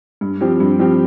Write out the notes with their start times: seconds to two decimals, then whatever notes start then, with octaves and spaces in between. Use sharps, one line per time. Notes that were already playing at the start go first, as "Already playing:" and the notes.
0.21 G2
0.41 F3 C4 G4
0.60 G2
0.79 F3 C4 G4